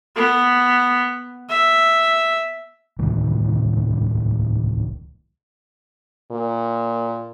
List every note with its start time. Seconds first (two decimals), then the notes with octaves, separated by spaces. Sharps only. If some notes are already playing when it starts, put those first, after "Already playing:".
0.16 B3
1.49 E5
2.99 D1 C2 A2 D#3
6.31 A#2